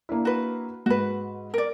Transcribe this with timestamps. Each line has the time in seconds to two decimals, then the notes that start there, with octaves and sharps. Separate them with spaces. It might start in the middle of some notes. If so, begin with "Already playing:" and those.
0.09 A#3 D4 E4
0.25 F#4 B4
0.86 G#2 F#4 B4
1.54 A#4 D5